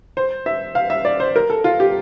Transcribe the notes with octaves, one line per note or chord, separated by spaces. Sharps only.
C5
E5
F5
E5
D5
C5
A#4
A4
F4
G4